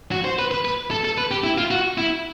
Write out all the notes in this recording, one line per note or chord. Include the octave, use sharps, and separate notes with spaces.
F#4
C5
B4
B4
B4
A4
A4
B4
G4
E4
F4
F#4
E4